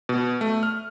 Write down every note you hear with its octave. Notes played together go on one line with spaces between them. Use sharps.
B2
A3
F6